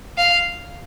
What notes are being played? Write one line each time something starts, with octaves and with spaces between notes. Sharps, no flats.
F5